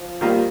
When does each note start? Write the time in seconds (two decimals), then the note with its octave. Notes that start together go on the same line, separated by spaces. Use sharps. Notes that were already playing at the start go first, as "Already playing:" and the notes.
Already playing: F3
0.21 D#3 G3 A#3 F4